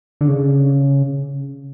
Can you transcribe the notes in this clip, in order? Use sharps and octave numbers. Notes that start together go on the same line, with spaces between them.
D3
C#3